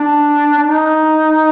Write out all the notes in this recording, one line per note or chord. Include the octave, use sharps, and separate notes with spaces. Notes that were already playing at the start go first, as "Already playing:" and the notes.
Already playing: D4
D4
D#4